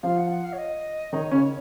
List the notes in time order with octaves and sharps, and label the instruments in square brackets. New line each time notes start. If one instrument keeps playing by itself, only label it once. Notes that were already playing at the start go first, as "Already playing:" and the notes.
[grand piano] F3 F4 [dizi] F5
[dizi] F#5
F#5
F5
C#5
D#5
[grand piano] D#3 D#4 [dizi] C#5
[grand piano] C#3 C#4